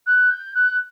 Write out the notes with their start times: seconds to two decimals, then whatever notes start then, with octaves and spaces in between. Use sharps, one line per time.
0.06 F#6
0.31 G6
0.55 F#6